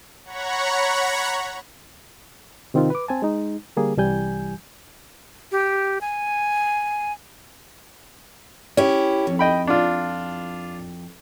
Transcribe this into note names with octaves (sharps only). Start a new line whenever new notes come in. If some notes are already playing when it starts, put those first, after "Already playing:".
C#5 F#5 A#5 B5 C#6
C3 D#3 C4 D#4 F4
B4 D6
C4 G#5 A5
G#3 D#4
D3 G3 A#3 G#4
C2 E3 G3 G#5 G6
G4
G#5
C#4 E4 G4
F2
D#5 G5 B5
D4 F4